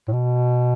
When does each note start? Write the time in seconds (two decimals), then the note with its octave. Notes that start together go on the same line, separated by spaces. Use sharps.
0.08 A2
0.13 B2